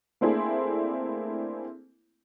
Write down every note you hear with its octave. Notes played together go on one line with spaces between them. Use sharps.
A3 A#3 C4 D4 E4 G#4